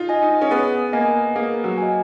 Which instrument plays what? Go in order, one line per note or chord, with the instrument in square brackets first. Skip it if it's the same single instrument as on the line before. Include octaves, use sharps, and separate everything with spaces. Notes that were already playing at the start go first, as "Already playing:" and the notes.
Already playing: [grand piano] D#4 F4
[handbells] D#5 G#5
[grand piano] D#4
C#4
[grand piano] B3 [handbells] G#4
[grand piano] A#3 [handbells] D#5 G#5
[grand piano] A#3 [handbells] G#4
[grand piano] F#3
[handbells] D#5 G#5